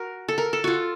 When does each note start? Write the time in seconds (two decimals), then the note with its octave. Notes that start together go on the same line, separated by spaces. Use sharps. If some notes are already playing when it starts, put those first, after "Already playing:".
Already playing: F#4 A#4
0.28 A4
0.38 A#4
0.53 A4
0.64 F4 F#4